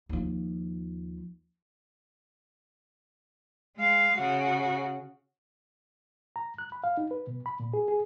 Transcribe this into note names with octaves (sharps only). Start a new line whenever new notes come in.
D#2 F3
G#3 F5
C#3 F#4
A#5
F#6
B5
F5
D#4
B4
B2
B5
A#2
G#4
G#4